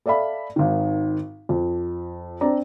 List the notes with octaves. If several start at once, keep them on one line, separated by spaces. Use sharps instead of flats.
A4 D5 E5 F5 B5
G#1 D#3
F2
C4 D4 D5 A#5